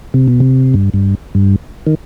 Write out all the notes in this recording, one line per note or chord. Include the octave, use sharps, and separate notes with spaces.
C3
B2
C3
G2
G2
G2
D#3